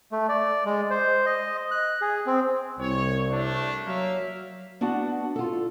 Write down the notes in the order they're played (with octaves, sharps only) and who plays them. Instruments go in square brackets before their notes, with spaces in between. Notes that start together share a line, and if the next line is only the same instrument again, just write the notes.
[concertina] A3
D5
G#3
C5
D#5
F#6
G#4
C4
[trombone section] C2 [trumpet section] C#5
[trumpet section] A3 D4
[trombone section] F#3 [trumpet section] A#3 E5 F5
[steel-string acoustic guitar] B3 D4 F#4 F#5 A5
F4 A4